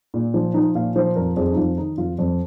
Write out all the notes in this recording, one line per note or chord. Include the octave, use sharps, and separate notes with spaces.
A#2
F3
F3 D#4
A#2 F5
F3 C5
F2 A#4
F2 G#4
D#4
F2 F4
D#3 D#4
F2 F4
F2